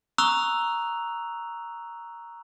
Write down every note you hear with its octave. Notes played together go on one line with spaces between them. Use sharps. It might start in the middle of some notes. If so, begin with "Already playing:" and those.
A#5 C#6 D#6 E6 F#6 F7